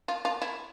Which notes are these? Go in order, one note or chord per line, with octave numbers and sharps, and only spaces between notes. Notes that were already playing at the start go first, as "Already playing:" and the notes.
F4
F4
E4